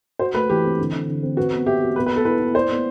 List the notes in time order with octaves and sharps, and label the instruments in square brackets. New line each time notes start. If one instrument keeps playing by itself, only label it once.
[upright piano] F#4 [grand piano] C5
[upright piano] A3 [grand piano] B4
[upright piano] E3 [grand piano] G4
[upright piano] C4
D3
D3
D3
C4
[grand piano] F#4 [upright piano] B4
[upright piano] B3
[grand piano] G4 [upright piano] E5
[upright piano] F#4
[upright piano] B3 [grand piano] B4
[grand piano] B4
[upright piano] B3 [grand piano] A4
[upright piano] E4 [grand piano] B4
[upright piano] E4
[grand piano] C5 [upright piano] D5
[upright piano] B3